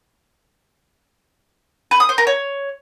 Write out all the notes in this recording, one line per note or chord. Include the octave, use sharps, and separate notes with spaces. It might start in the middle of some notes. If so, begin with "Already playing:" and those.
B4
D#6
C5
A#4
C#5